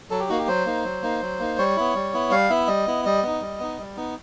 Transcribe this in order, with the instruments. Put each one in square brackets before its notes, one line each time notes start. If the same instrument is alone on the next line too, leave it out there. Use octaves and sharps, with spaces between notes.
[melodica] F#3 A4
G4
A#3 D#4 F#4
G4
F#3 C5
A#3 D#4
F#3
A#3 D#4
F#3
A#3 D#4
G3 C#5
B3 E4
G3
B3 E4
G3 F5
B3 E4 E5
G3 D#5
B3 E4
G3 D#5
B3 D#4
G3
B3 D#4
G3
B3 D#4